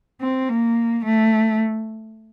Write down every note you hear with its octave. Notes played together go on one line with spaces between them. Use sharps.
C4
A#3
A3